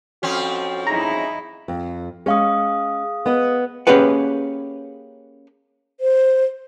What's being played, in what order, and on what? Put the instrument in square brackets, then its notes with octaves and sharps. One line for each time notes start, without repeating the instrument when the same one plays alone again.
[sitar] F2 C4 C#4 [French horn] F#4
[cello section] D#4 E4 [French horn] G#4 [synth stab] A#5
[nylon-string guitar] F2
[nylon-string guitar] G#3 C#4 [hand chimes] G#4 F5 D#6
[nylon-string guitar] B3 B4 D#5
[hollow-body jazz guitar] A#3 C#4 G4 G#4 B4 F#5
[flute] C5